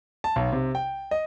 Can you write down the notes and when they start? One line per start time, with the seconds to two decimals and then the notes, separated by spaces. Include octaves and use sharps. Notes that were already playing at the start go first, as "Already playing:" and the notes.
0.24 A5
0.36 B1
0.52 C3
0.75 G5
1.11 D#5